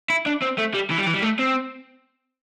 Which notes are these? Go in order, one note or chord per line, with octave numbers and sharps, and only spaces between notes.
E4
D4
C4
A3
G3
E3
G3
E3
G3
A3
C4